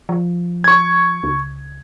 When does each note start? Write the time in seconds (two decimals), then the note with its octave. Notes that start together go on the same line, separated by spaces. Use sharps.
0.09 F3
0.64 C#6 G#6
1.23 C#2